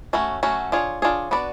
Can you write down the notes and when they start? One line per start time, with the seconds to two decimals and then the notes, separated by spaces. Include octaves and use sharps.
0.13 F#3 A3 C#4 F#4
0.43 F#3 A3 C#4 F#4
0.72 D4 F4 G#4 C#5
1.02 D4 F4 G#4 C#5
1.31 B3 D4 F#4 B4 D5